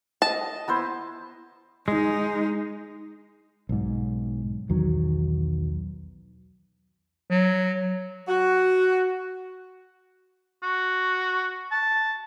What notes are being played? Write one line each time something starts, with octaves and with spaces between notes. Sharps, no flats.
D#5 A5
B3 E4 C5
G#3 D#4
B1 G#2
B1 E2 D#3 F#3
F#3
F#4
F#4
A5